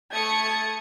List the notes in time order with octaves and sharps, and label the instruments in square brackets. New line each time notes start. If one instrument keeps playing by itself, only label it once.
[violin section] A3 D#6 C#7 [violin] G#6 A6